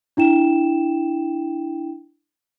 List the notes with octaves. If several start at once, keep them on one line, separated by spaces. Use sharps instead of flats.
D4 E4 G5 E7